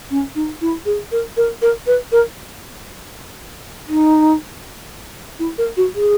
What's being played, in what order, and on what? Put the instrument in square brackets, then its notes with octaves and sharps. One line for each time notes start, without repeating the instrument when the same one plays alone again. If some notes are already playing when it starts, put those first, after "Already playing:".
[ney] C#4
D#4
E4
G#4
A#4
A#4
A#4
B4
A#4
D#4
E4
A#4
F#4
G#4